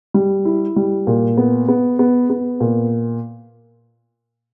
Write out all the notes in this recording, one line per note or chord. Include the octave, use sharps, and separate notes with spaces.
G3
E4
G3
A#2
B3
B3
B3
B3
A#2